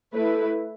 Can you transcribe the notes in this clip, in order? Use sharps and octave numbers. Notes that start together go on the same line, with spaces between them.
A3 E4 B4